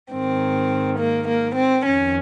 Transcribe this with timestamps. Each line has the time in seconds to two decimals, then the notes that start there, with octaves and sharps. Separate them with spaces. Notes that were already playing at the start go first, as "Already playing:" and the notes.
0.12 G#2 D#3 C4
0.98 A#3
1.27 A#3
1.55 C4
1.84 F2 D#3 C#4